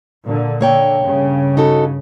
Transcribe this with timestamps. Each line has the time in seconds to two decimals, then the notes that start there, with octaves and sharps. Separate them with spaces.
0.24 A#2 D3
0.61 D3 A#3 C#5 G5
1.02 G2 C#3
1.57 D#4 F#4 A4